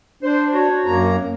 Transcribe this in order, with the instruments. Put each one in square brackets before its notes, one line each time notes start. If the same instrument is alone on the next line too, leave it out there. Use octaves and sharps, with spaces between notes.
[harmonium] D4 [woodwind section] C5
[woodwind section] F#4 C#5
[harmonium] F#2 A#3 A#5